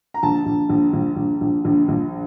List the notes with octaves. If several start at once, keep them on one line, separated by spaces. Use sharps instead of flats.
A#5
A#1 A5
A#1
A#1
A#1
A#1
A#1
A#1
A#1